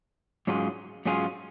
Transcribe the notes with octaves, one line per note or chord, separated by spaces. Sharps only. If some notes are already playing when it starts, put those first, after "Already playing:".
G#2 F#3 C#4 F4 G#4
G#2 F#3 C#4 F4 G#4